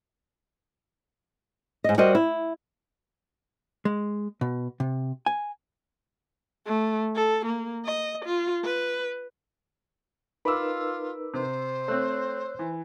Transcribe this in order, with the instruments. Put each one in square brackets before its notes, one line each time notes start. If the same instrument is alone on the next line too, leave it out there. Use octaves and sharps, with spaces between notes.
[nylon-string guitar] G#2 D#5
G3 F#4 A#4 C5 D#5
E4
[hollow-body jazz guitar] G#3
B2
C3
G#5
[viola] A3
A4
A#3
D#5
F4
B4
[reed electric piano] D#4 A#4 B4 [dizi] F4 [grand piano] B5 D6 E6
[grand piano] C3 [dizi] C5
[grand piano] A3 C4 [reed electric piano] C#5 E6 F#6
[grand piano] E3